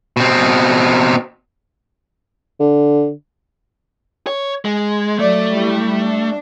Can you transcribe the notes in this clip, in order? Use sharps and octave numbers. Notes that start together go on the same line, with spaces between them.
B2 C4
D3
C#5
G#3
F#3 A3 D5
G3 E4 G4
D4